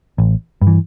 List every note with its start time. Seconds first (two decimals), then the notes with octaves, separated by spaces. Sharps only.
0.18 A1
0.61 G2
0.67 E3